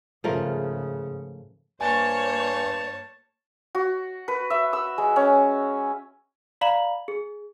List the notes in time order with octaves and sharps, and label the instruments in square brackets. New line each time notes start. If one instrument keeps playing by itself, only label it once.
[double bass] G#2 C#3 [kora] F3 A3 A#4
[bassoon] G2 [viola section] A#3 C5 C#5 [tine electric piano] G#5 [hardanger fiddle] A5
[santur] F#4
B4
E5
E6
G#3
C#4
[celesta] D5 F5 A#5 B5 F#7
G#4